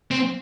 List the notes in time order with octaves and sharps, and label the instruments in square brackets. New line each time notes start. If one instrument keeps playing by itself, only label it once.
[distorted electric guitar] C4